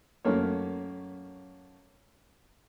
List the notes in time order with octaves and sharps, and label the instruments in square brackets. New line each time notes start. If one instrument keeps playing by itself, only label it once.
[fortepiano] F#2 A3 A#3 C#5